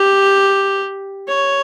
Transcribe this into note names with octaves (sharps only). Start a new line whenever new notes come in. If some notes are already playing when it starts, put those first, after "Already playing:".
Already playing: G4
C#5